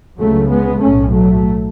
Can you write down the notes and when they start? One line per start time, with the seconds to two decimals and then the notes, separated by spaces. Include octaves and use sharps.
0.19 C#2 C#3 F#3 A3
0.50 G#3 B3
0.81 B1 A2 A3 C#4
1.12 F#3 A3